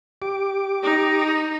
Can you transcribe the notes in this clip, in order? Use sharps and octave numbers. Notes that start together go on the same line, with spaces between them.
G4 D6
D#4